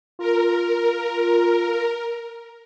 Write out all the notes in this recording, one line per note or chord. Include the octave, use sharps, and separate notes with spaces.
F4 A#4